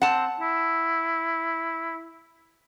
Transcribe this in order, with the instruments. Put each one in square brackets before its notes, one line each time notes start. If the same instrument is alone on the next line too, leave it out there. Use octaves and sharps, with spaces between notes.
[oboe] C4 [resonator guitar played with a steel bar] F#5 A5
[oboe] E4